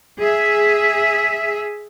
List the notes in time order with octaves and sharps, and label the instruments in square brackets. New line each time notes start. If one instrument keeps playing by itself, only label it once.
[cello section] G#4 E5